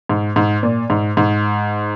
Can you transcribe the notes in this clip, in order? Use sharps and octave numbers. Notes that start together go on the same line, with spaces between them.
G#2
G#2
A#2
G#2
G#2